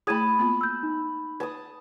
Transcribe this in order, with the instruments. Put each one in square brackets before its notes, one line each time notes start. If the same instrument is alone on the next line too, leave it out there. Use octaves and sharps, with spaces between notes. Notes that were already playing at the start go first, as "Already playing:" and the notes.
[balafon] A3 E4 G#4 [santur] A5 B5 [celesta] D#6 G#6 D#7
[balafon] A#3 B3 F4
[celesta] E6 G6
D#4
[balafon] B4 [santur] A5 D#6